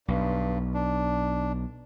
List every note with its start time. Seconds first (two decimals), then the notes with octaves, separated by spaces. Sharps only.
0.08 B1 G2
0.74 D4